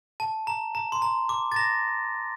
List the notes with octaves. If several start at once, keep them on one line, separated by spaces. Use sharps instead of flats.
A5
A#5
A#5
C6
A#5
D6
A6
A#5 A#6